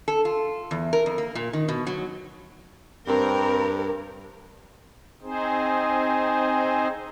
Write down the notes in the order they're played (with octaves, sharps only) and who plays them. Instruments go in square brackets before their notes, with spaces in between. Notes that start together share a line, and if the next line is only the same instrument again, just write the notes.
[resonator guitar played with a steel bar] A4
F4
E2
A#4
F2
A#3
A#2
D#3
B2
F#3
[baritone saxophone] G2 [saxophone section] C4 [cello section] A#4
[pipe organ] C4 D#4 G#4 C5